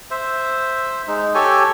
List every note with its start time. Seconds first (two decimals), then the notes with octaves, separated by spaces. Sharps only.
0.11 C5 E5
1.08 G#3 D#4
1.34 G4 A4 C#5 G#5